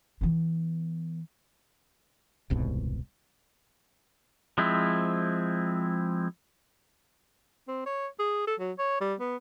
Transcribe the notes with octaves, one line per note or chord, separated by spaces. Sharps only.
E3 B3
D#1 C2 G#2 B2
F3 G#3 C4 E4
C4
C#5
G#4
A4
F#3
C#5
G3
B3